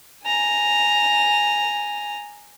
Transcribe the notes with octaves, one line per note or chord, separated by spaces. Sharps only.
G#5 A#5